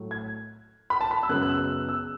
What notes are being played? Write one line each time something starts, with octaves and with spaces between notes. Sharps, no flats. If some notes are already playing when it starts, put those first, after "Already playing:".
Already playing: A2 F#3 A3
G#6
B5
A5
B5
E6
F#2 C#3 G#3 B3 F#6
F#6
E6
E6